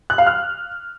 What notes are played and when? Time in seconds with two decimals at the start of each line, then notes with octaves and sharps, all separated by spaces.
0.10 F#6
0.18 F5
0.27 F6